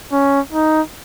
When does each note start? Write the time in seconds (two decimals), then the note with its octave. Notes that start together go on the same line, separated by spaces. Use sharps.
0.12 C#4
0.53 D#4